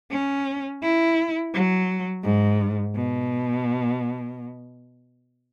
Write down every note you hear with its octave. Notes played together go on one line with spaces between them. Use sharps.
C#4
E4
F#3
G#2
B2